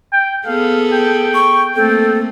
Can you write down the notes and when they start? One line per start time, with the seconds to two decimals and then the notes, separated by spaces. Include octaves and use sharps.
0.12 G5
0.46 B3 G#4 A4 F5
0.93 G5
1.35 C#6
1.76 A3 A#3 C4 A4